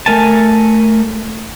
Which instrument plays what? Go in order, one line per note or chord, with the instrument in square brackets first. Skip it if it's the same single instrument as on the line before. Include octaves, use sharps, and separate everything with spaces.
[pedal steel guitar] A3 A#4 G#5 A5